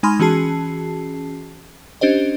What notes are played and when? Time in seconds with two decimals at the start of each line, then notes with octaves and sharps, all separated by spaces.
0.03 G#3 D#4 G#5 B5 C6 F6
0.20 E3 C#4 F#4 G#4 A5 C7
2.01 C#4 D4 G4 C5 D#5